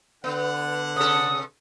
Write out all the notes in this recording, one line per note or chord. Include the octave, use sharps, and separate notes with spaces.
D3 B3 F#5
C3 A4 D#6